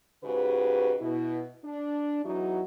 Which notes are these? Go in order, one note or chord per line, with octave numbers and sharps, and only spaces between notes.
G#2 C#3 F#4 G4 B4
B2 E4
D4
E2 F#3 D#4 E4 F#4